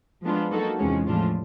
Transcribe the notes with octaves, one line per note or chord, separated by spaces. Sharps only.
F3 G#3 B3 D4 F4
F#3 A#3 D#4 F#4 A4
E2 C3 F3 G#3 C#4
A2 F3 A3 D4 F4